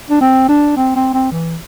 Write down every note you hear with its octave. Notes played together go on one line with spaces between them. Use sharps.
D4
C4
D4
C4
C4
C4
E3